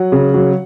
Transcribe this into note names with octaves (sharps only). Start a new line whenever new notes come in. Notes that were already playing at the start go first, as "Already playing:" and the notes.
Already playing: F#3 F#5
C#3
F#3